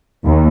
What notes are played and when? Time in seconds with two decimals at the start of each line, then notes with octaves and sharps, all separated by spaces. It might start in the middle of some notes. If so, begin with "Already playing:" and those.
0.25 D#2